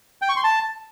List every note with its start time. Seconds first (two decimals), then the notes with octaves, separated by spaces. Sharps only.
0.22 G5
0.29 C#6
0.36 C6
0.44 A5